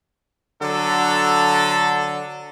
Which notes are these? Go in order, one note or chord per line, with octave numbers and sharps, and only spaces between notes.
D3 F#3 D4 A4